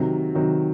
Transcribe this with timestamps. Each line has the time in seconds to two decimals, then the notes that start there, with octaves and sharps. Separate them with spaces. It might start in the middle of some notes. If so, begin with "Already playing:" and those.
Already playing: C3 D#3 F#3
0.35 C3 D#3 F#3